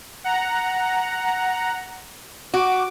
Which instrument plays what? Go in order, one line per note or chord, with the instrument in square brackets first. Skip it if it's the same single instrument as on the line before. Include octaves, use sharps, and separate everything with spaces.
[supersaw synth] F#5 A#5
[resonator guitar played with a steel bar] F#4 [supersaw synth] D6